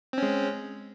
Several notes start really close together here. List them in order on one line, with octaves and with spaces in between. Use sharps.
C4 C#4 G#3